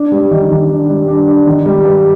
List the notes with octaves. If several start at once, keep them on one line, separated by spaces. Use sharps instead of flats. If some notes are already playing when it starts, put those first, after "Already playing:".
Already playing: D4
G3
D#3
D#3
D4
G3
D4
D4
D#3
G3
G2